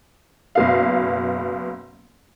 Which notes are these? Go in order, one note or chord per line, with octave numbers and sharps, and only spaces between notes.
F#1 B2 F5